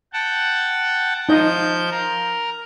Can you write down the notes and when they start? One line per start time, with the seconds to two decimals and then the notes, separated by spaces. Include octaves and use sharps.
0.13 F#5 G5 A5
1.29 F3 D#4 D#5 G6
1.91 A#4